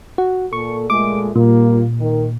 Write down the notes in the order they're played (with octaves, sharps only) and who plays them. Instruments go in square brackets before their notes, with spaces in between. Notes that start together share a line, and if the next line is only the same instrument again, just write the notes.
[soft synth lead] F#4
[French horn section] A#2 A4 [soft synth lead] C#6
[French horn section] A#2 G#3 A3 [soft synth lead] D6
[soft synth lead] A#2 [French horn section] G3 A#3 F4
[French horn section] D#3